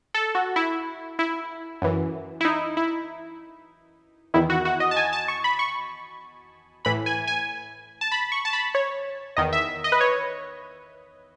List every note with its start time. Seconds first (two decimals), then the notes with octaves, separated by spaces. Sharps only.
0.14 A4
0.35 F#4
0.56 E4
1.19 E4
1.82 F#2 E3
2.41 E4
2.45 D#4
2.77 E4
4.34 E2 D#3 E4
4.50 F#4
4.65 F#4
4.80 D#5
4.91 A5
4.96 G#5
5.13 A5
5.28 C#6
5.44 B5
5.59 C#6
6.85 A2 E3 B5
7.06 G#5
7.27 G#5
8.01 A5
8.12 B5
8.32 C#6
8.45 A5
8.53 B5
8.75 C#5
9.37 E2 D#3 D#5
9.53 E5
9.84 D#5
9.92 B4
10.01 C#5